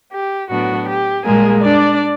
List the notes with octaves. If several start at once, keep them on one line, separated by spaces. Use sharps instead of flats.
G4
A2 F#3 B3 D4 F#4
G4
A#2 G3 G#3 A#3 G#4
D4 D5